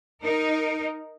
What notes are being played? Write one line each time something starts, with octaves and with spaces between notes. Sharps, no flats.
D#4 A#4